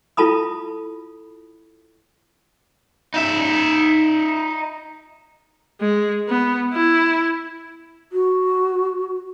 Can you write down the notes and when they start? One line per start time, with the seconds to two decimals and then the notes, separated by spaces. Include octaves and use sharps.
0.17 E4 F4 A4 A5 B5 D#6
3.14 D#4 E5
5.81 G#3
6.29 B3
6.73 E4
8.12 F#4